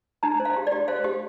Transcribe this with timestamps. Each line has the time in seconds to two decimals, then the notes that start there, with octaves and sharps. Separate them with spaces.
0.23 D4 A#5
0.40 C5
0.45 F5
0.56 G4
0.67 D5
0.72 G4
0.88 C5 F5
1.04 G4